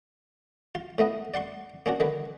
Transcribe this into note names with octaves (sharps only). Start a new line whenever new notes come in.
F4
A2 A3 B3 D#5
D5 F#5 C6 C#6
A#3 C#4 D4 F#4
D3 D#3 B4